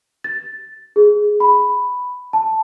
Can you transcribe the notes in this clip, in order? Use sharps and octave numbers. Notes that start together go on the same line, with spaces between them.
A6
G#4
B5
A5